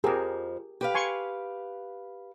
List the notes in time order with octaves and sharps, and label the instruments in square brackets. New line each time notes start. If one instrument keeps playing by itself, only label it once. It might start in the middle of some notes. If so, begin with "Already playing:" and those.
[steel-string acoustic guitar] F2 F3 [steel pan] G4 G#4 A#4
[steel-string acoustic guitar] G4 B4 F5
[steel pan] G#5 C6 C#6